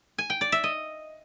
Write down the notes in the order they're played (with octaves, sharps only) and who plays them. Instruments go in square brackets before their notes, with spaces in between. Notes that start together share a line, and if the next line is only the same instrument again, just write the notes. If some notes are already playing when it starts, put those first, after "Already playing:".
[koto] G#5
G5
D5
E5
D#5